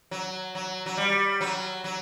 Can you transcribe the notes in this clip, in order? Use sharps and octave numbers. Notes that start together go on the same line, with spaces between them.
F#3
F#3
F#3
G3
F#3
F#3